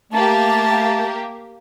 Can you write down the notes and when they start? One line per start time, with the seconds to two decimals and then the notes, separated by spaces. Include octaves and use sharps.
0.12 A3 A#3 G4 A5